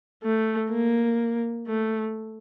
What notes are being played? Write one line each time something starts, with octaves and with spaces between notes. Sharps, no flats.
A3
A#3
A3